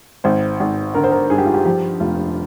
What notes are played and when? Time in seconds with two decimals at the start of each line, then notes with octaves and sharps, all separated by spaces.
0.24 G#1 C5
0.60 G#1
0.95 D3 A#4
1.04 C5
1.12 A#4
1.30 G2 G#4
1.38 G4
1.46 F4
1.54 G4
1.65 F3 G4
2.00 F1 F4